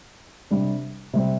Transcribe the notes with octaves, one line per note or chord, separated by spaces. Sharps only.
C3 G3 D4
C3 G3 C4